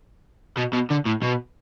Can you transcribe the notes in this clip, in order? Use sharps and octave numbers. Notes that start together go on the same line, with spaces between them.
B2
B2
D3
A2
B2